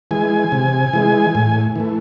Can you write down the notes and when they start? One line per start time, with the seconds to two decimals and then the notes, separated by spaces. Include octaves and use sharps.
0.11 E3 G#3 G#5
0.52 C3
0.93 E3 G#3
1.35 A2
1.76 E3 A3